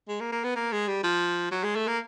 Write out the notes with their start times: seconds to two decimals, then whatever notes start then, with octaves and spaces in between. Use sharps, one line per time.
0.08 G#3
0.21 A#3
0.32 A#3
0.44 B3
0.56 A#3
0.72 G#3
0.88 G3
1.04 F3
1.51 F#3
1.64 G#3
1.76 A3
1.88 A#3